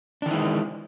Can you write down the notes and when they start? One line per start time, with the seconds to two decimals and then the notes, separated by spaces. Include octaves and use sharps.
0.22 D4
0.26 D#3
0.30 E3
0.33 G#3